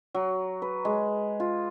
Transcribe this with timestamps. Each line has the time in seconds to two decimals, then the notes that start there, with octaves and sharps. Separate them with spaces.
0.14 F#3
0.62 B4
0.85 G#3
1.40 F4